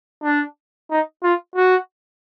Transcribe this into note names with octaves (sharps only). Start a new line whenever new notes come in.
D4
D#4
F4
F#4